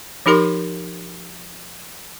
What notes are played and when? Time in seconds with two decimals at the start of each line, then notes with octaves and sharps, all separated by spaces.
0.26 F3 D#4 G4 A#4 C6